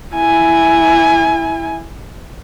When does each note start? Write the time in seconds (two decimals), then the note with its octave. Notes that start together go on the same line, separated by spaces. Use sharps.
0.15 E4 G#5